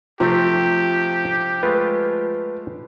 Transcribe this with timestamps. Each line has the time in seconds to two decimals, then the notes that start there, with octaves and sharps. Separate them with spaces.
0.20 C3 F3 A3 C4 G4
1.63 G#3 A3 F4 B4